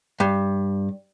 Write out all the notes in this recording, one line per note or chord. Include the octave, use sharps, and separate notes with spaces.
G2